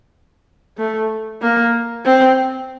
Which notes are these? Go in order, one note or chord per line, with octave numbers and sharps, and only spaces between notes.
A3
A#3
C4